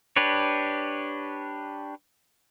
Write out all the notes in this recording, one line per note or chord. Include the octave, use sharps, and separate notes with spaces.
D4 G4 B4 C#5